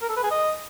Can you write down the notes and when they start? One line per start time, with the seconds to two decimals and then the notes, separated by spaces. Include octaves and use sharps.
0.02 A#4
0.09 A4
0.17 B4
0.24 G#4
0.31 D#5